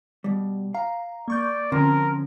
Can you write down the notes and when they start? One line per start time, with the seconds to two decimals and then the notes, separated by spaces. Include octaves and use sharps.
0.24 B2 G3
0.74 F5 A#5
1.28 A#3 D5 C#6 G6
1.72 D3 F3 C4 C#4 A#4